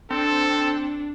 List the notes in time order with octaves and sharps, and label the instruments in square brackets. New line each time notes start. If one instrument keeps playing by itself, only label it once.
[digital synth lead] C4 [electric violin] D4 [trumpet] A4